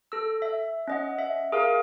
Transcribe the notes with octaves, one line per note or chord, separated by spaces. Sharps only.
A4 E6
E5
C#4 D#5 F#5
E5
G#4 A#4 F5